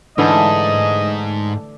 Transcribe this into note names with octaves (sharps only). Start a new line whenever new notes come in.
G#2 D3 E3 A3 D4 A4 D5 D#5